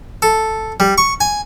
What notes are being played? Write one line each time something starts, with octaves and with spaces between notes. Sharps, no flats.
A4
G3
C#6
G#5